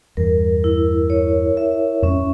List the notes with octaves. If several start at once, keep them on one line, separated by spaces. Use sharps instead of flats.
E2 G2 A#4
E4
C#5
E5
F2 G#2 C#4